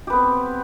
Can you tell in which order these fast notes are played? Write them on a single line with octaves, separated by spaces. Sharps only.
G4 B4 B3 C4